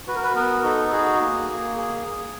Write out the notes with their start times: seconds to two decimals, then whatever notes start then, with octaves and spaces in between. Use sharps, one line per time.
0.08 F#4 B4
0.16 A#4
0.23 B4
0.35 B3 A#4
0.64 D#4 A4
0.92 F#4 G#4
1.21 A#3
1.49 A#3
1.77 G#4
2.05 G#4